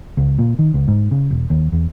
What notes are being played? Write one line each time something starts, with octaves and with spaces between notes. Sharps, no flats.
C#2
A#2
D#3
C#2
G#2
C#3
E1
D#2
E2